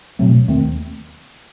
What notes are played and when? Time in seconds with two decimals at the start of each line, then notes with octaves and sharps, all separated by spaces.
0.19 B2 F#3 A3 C4
0.48 D#2 D#3 A3 C4